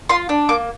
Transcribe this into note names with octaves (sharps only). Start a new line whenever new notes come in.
F4 C6
D4
A#3 D6